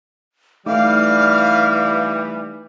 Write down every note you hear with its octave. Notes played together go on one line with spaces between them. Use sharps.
E3 G3 A3 D#4 F5 D6